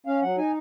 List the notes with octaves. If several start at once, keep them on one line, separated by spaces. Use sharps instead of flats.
C#4 F5
F#3 F#5
D#4 G#5